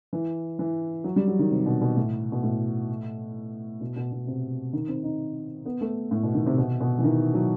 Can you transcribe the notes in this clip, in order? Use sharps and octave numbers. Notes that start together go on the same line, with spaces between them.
E3
E3
F#3
G3
F#3
D#3
C3
B2
B2
A2
B2
A2
B2
B2
B2
C3
D#3
C4
D#4
B3
A3
A2
B2
D#3
C3
B2
B2
E3
D#3
F#3